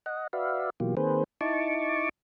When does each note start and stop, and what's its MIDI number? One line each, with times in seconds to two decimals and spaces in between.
0.06 0.27 75
0.06 0.27 78
0.33 0.70 66
0.33 0.70 71
0.33 0.70 74
0.33 0.70 76
0.33 0.70 77
0.80 0.95 47
0.80 0.95 52
0.80 0.95 54
0.80 0.95 58
0.80 0.95 65
0.80 0.95 67
0.97 1.24 51
0.97 1.24 58
0.97 1.24 60
0.97 1.24 68
0.97 1.24 71
0.97 1.24 72
1.41 2.09 63
1.41 2.09 64
1.41 2.09 81
1.41 2.09 85
1.41 2.09 86